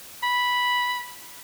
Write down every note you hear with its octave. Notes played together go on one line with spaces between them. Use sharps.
B5